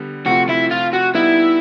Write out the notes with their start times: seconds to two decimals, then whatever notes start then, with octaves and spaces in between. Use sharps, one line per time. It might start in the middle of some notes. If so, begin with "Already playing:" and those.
Already playing: D3 G3 B3
0.26 C3 F3 A3 C4 F4 F#4
0.49 E4
0.71 F4
0.93 F#4
1.14 G3 B3 D#4 E4